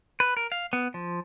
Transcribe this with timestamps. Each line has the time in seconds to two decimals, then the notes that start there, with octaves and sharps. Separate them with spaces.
0.20 B4
0.37 A#4
0.52 F5
0.73 B3
0.94 F3